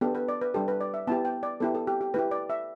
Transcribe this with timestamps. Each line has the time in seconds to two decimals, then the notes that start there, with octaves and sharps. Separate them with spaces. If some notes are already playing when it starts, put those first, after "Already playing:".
0.01 B3 D4 G4 A4
0.15 B4
0.28 D5
0.41 B4
0.54 G3 D4 G4 A4
0.68 B4
0.81 D5
0.94 E5
1.07 B3 E4 G4 A5
1.25 G5
1.43 D5
1.60 B3 E4 G4 A4
1.75 A4
1.87 G4
2.01 G4
2.14 A3 E4 G4 B4
2.31 D5
2.50 E5